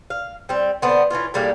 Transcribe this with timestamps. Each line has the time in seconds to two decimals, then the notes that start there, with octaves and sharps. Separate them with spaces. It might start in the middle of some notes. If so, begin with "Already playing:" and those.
0.10 F5
0.49 G3 C4
0.82 D3 B3 C4
1.11 E3 G3 C#4 F4
1.34 A2 G3 G#3 A#3